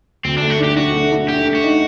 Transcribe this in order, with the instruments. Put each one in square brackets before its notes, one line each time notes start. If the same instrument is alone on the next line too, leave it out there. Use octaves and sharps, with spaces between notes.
[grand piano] D2 [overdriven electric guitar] C4
[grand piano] A3 [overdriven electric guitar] D4
[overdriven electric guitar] F#4
[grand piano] D4 [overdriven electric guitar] G4
[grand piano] D4 [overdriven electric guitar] F#4
[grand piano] A3
D4
[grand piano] A3 [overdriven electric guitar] G4
[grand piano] A3
[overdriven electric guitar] F#4
[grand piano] D#4